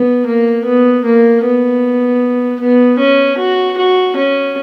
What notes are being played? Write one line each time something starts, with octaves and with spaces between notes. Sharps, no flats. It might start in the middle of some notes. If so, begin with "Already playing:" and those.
Already playing: B3
A#3
B3
A#3
B3
B3
C#4
F#4
F#4
C#4